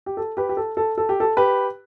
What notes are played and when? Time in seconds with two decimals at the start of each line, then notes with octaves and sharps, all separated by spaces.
0.06 G4
0.17 A4
0.37 G4 B4
0.49 G4
0.57 A4
0.77 A4
0.98 A4
1.09 G4
1.20 A4
1.37 G4 B4